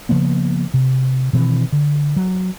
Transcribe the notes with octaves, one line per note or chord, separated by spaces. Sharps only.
C#3 F3 A#3 B3
C3
B2 D#3 E3 C4
D3
F#3